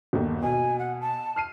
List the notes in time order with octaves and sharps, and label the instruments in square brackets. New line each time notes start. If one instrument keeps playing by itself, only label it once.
[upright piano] G1 D#2
[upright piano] B2 [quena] G#5
[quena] F#5
A5
[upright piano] F6 C7 D#7